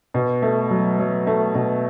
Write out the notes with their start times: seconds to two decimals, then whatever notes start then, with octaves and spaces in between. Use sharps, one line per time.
0.14 B2
0.42 A3
0.71 F#3
0.99 F#3
1.27 A3
1.55 B2